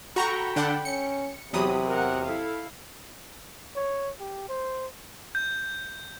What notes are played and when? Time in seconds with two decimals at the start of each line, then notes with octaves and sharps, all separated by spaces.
0.16 F#4 A4 G5 A#5 B5 C#6
0.56 D3 D4 F#5
0.85 C#4 C#7
1.53 E2 C3 F#3 G4 B5 D#6
1.86 A#4 F#5
2.25 E4 A4 F5
3.76 C#5
4.20 G4
4.49 C5
5.35 G6